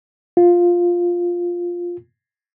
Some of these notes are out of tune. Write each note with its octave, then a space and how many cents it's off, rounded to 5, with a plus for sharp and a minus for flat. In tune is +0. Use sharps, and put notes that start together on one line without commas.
F4 +5